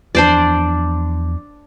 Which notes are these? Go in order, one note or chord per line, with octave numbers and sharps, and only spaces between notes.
E2 F3 D4 C5 D5